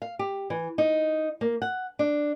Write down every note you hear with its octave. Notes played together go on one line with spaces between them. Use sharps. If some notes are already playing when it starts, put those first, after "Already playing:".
F5
G4
E3
D#4
A#3
F#5
D4